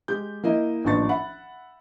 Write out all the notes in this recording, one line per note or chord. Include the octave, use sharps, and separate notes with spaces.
G#3 G4 G6
A#3 E4 D#5
A1 D#2 F3 D4 C#6 A6
E5 F#5 B5